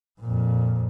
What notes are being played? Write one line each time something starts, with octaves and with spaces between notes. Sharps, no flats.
F2 A#2